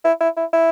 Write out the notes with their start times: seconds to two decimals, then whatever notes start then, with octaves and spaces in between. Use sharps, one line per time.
0.04 E4
0.20 E4
0.37 E4
0.53 E4